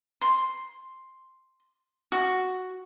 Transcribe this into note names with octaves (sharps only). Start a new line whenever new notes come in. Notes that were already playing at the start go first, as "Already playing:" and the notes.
C6
F#4